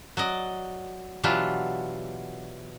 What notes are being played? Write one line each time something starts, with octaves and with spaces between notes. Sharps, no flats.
F#3 D5 D#5
B2 E3 F#3 D4 F4 G4